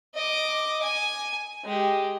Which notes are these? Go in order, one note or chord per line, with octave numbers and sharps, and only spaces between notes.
D#5 D6
G#5
G#3 G4